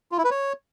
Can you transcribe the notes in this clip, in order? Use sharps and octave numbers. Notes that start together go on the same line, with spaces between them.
F4
E4
B4
C#5